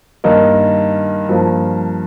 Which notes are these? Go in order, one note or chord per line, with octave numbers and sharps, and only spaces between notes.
G2 D#3 A#3 D#4
G2 F3 A#3